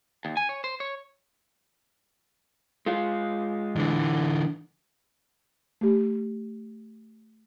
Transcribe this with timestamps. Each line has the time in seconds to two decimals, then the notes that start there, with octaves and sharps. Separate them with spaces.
0.25 D#2
0.37 G#5
0.49 C#5
0.64 C5
0.80 C#5
2.86 G#3 F4
3.76 D3 E3
5.81 A3 G4